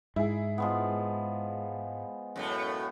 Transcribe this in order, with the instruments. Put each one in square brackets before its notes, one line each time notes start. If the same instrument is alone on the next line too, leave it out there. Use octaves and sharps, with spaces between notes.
[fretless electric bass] G#2 [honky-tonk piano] E4 G#4
[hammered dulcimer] F3 G#3 B3
[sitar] F#2 A2 A3